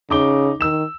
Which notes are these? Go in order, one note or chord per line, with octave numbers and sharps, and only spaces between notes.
C#3 D#4 D6 G7
D#3 E6 E7